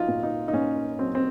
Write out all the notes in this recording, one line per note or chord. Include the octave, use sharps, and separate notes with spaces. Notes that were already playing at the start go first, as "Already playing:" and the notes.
Already playing: F#3 D#4 F4
A#2
D#4
D#4
A#2 C#4
F#3 C4
C4